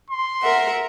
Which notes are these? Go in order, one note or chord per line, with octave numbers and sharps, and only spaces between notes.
C6
A#4 E5 F#5